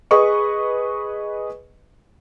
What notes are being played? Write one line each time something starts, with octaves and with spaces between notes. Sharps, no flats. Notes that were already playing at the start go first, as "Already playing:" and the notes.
G#4 B4 D#5 C#6